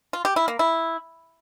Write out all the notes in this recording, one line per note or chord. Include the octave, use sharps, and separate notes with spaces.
F4
G4
E4
A#3
E4